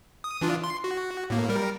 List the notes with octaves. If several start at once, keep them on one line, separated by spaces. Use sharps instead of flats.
D#6
E3 D4 F4
C6
F#4
A2 A#3
G3 A#4